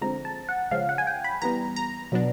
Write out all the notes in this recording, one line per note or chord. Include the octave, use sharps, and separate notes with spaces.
D3 F3 G#3 C4 A#5
A5
F#5
C#3 F3 G#3 C#4 F5
F#5
G#5
G5
B5
E3 G3 B3 A#5
A#5
B2 F#3 B3 D4